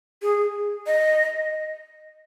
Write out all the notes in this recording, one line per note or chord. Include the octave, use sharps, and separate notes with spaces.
G#4
D#5